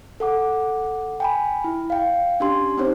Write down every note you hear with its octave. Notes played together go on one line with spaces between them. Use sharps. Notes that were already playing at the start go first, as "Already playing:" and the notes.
A4 F#5 D6
G5 G#5 B5
E4
F5 G5
C#4 D4 G4 C6
C4 D4 D#4 G4 C5 C#5